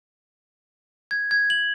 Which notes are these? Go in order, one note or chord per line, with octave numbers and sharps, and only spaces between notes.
G#6
G#6
F#7